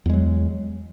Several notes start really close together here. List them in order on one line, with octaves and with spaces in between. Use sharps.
E2 G#3 F#3